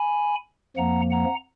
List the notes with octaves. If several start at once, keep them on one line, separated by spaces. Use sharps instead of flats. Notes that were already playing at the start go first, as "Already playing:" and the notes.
Already playing: G#5 B5
F2 F3 A#3 F#5 A#5
F#5 A#5